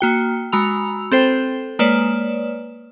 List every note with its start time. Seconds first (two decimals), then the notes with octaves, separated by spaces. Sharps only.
0.01 A#3 F#4 G5
0.52 G#3 F#4 A#5 B5 E6 F7
1.12 C4 A4 C5 G5
1.79 G#3 A#3 B4 C#5 D5 E7